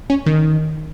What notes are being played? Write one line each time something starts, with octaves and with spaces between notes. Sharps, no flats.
C#4
D#3